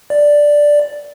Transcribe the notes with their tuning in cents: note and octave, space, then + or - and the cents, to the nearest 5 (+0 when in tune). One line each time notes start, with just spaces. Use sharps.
D5 +0